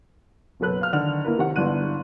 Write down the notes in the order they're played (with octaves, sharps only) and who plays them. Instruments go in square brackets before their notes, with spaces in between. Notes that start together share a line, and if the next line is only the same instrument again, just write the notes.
[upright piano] F#1 B2 F#3 A4 B4 F#6
F5 F6
D3 D#3 F6 F7
A#3 E4 A#4 B4
C3 D#3 F#5
G1 D3 E4 F#6 D#7